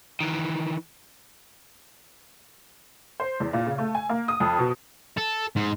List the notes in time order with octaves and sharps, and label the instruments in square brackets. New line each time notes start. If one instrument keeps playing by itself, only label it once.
[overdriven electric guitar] D#3 E3
[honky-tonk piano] C5
E2
A#2
C#3
A3
G#5
A#3
D#6
F2
B2
[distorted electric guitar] A4
G#2